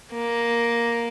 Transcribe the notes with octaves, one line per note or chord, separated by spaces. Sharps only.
A#3